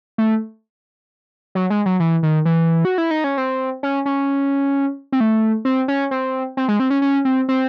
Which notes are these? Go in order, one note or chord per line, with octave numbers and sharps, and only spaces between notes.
A3
F#3
G#3
F#3
E3
D#3
E3
F#4
E4
D#4
C#4
C4
C#4
C#4
C4
A3
C4
C#4
C4
C4
G#3
C4
C#4
C#4
C4
C4